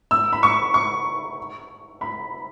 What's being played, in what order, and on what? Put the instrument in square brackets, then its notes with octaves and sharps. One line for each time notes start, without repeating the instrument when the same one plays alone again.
[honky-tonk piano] E6
B5
C#6
C#6
B5